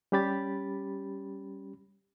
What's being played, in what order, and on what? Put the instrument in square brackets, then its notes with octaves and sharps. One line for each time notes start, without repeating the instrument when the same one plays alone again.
[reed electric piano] G3 C#4 G4 B5 A6